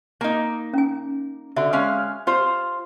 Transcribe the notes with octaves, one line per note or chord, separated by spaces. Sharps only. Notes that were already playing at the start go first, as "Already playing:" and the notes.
A#3 D#4
C#4 G#5
D3 F#4 E5
G#3 C#4 F5
F4 C5